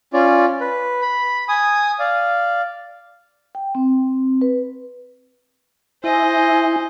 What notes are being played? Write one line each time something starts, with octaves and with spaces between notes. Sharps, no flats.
C#4 F4 D5
B4
B5
G#5 D#6
D5 F5
G5
C4
B4
E4 C5 D#5 G#5